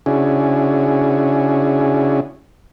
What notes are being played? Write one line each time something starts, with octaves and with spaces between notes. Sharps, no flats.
C#3 C#4 D4 E4 F#4 G#4